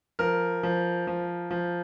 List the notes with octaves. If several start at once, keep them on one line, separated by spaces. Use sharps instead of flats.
F3 A#4
F3
F3
F3